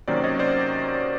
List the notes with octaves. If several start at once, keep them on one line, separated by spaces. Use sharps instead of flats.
C3 D#3 F#3 A#3 C#4 C5 D5
C#5 D#5
C5 D5